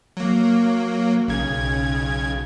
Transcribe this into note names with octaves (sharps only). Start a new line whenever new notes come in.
F#3 A#3
B1 C#3 G#6